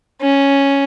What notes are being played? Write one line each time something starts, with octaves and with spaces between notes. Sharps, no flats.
C#4